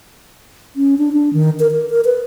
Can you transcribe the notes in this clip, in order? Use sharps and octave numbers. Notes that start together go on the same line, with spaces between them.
C#4
D4
D4
D#3
A#4
A#4
A#4
B4